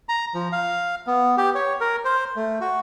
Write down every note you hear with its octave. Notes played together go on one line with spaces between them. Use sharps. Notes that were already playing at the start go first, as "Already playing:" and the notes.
A#5
F3
F5
B3
G4
C#5
A#4
C5
A3
F#4